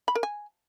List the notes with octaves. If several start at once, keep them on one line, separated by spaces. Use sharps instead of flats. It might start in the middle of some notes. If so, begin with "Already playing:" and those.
B5
A#4
G#5